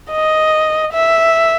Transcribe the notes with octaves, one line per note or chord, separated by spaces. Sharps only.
D#5
E5